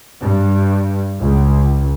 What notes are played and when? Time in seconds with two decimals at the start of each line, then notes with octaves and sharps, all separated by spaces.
0.21 G2
1.21 C#2